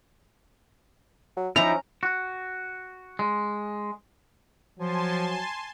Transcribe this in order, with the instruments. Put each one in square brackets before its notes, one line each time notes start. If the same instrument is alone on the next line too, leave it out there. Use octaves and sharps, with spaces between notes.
[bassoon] F#3
[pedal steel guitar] F3 D#4 E4 [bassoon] C#4 [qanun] A#5
[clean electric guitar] F#4
G#3
[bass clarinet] F3 [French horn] F#3 [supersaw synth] G#5 A5 C6